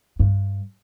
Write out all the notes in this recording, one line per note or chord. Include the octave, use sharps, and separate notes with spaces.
G2